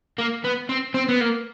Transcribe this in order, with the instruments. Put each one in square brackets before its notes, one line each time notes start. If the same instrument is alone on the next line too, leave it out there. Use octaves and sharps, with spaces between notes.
[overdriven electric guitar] A#3
B3
C4
C4
B3
A#3